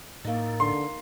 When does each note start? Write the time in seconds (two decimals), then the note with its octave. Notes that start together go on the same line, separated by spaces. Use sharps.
0.25 A2 A#3 D#4
0.60 D3 C6